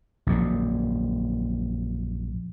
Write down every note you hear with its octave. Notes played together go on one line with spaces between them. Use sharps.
A#1 F#2 A#2